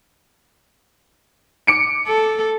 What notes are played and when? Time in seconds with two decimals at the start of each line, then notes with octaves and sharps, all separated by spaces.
1.67 D6 C#7 D7
2.07 A4